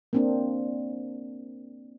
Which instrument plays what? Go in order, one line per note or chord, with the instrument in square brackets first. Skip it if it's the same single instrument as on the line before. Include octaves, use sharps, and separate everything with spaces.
[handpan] A#3 C4 D4